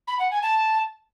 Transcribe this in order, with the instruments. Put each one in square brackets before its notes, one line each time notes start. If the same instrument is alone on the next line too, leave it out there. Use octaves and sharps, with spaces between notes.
[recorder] B5
F#5
G#5
A5